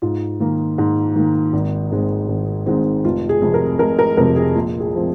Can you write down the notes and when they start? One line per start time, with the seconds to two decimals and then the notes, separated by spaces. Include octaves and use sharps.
0.02 G#2 F4
0.40 D#3 A#3
0.78 G#2
1.16 D#3 A#3
1.53 G#1
1.91 G#2 D#3 G#3 C4
2.28 G#1
2.66 G#2 D#3 G#3 C4
3.04 F1 F4
3.29 G#4
3.42 F2 C3
3.54 A#4
3.79 F1 A#4
3.99 A#4
4.17 F2 C3 A#4
4.36 G#4
4.55 A#1 F4
4.80 G#4
4.95 F3 C4